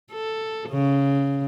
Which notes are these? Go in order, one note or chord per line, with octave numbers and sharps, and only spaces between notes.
A4
C#3